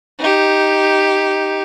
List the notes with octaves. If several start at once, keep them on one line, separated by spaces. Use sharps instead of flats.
D#4 G4